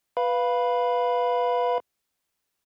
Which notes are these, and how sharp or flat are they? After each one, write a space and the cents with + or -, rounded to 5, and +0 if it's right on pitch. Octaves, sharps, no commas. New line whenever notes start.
B4 +0 F5 +0 B5 -5